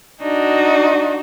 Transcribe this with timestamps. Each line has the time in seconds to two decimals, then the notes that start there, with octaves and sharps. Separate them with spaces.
0.23 D4 D#4 F#4